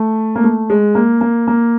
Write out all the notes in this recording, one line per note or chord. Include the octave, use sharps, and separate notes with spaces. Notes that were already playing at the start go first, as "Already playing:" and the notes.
Already playing: A3
A#3
A3
G#3
A#3
A#3
A#3